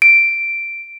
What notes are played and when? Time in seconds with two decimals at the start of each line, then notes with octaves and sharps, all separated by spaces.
0.02 D7